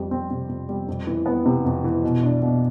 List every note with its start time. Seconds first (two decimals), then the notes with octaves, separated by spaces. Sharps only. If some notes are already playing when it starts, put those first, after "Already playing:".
Already playing: F2 G3
0.11 C4
0.30 C3
0.49 F2
0.69 G3
0.88 F2
1.07 E3
1.26 B3
1.46 C3
1.65 F2
1.84 E3
2.03 B2
2.23 D4
2.42 B2